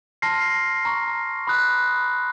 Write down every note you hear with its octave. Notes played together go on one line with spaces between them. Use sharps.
A5 C6 F6 A#6 C7
A#5 C#6 F6
B5 D#6 F#6